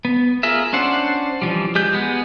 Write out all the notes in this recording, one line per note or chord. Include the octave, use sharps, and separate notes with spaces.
B3
F4 G#4 A#4 E5
C#4 D4 C5 F#5
E3 F3 G3
G#3 G4 G6
G#3 B3